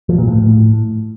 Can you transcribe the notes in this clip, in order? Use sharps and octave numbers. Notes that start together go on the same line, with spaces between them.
F3
A#2
A2